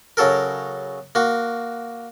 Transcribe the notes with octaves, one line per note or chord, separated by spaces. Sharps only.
C#3 F#3 A4 A#4
A#3 F#4